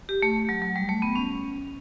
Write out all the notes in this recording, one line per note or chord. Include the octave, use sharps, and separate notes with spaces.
G4
A3
F#3
F#3
G3
A3
B3
C#4